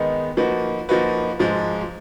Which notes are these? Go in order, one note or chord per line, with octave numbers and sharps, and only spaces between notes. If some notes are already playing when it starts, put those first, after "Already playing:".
Already playing: D#3 G#3 B3 D#4
F3 A#3 D#4 F#4 B4
F3 A#3 D#4 F#4 B4
G#2 F3 G#3